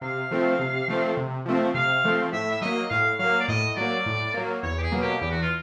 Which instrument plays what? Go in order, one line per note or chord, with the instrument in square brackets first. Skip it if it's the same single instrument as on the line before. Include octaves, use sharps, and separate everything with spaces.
[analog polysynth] C3 [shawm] F5
[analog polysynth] F3 A3 C4
C3
F3 A3 C4
C3
F3 A3 C4
[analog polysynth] C3 [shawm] F5
[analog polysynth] F3 A3 C4
[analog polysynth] A2 [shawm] E5
[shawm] E5
[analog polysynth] F#3 A#3 [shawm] D#5
[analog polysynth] A2 [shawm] F5
[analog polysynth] F#3 A#3 [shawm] F5
[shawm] D5
[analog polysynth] A2 [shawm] D#5
[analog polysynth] F#3 A#3 [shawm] D5
[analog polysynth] A2
F#3 A#3
[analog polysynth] E2 [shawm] C#5
[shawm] G4
G#4
[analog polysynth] B2 F#3 A#3
[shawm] G4
[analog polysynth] E2 [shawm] G4
[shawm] F#4
F4